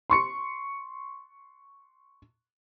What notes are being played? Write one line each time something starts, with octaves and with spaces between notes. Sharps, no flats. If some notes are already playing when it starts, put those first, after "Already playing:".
C6 C#6 C#7